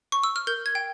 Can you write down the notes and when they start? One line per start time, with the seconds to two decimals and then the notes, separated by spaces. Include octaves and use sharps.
0.12 C#6
0.24 E6
0.36 F6
0.47 A#4 G6
0.66 G#6
0.75 G5